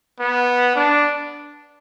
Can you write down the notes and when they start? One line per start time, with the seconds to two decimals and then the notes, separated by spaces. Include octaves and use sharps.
0.20 B3
0.76 D4